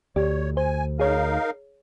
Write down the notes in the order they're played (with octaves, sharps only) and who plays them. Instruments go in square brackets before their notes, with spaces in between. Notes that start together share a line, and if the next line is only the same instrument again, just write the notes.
[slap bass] D2 [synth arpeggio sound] G4 D5 [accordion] C#5
[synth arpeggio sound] C5 [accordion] G#5
[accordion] D#4 A#4 F5 [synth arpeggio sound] G#4 C#5